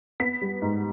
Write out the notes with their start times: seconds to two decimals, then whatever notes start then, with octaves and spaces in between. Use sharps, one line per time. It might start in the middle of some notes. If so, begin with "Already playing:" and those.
0.20 B3 B6
0.41 G3
0.62 G#2